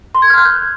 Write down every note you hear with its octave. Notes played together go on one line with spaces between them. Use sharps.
C6
G#6
F6
F#6
G6